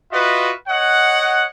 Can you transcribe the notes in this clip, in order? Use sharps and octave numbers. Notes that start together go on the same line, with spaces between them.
F4 F#4 B4 D#5 E5
C#5 D#5 F#5